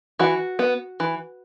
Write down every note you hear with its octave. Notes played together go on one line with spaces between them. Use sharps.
E3 F#4
B3
E3